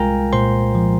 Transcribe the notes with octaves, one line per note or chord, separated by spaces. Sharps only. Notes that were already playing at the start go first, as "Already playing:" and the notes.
Already playing: C2 G#3 F4 A#4 F5 G5 G#5 A#5
A#2 C5 C6
F3